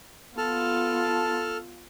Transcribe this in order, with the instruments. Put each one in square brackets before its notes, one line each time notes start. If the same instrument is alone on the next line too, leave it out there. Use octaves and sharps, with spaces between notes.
[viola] B3 F4 [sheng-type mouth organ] A4 A5 F6